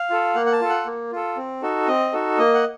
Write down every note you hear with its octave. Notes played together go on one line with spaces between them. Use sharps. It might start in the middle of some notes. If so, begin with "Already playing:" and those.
Already playing: F5
F4 A4
A#3 F#5
F#5
A5
F4 A4
F#5
A#3
F4 A4
C4
D#4 F#4 A4
C4 D#5
D#4 F#4 A4
A#3 D#5
F#5